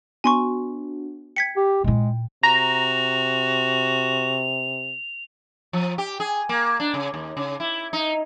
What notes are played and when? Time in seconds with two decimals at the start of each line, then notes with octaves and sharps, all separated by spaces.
0.24 B3 D4 F#4 G#5 C6 C#6
1.36 G5 G#6 B6 C#7
1.57 G4 G5
1.84 A#2 G#3 E4
2.43 C3 F#4 A#5 F7
5.73 F3
5.98 G4
6.20 G#4
6.49 A#3
6.80 D4
6.94 C#3
7.14 D#2
7.37 C#3
7.60 E4
7.93 D#4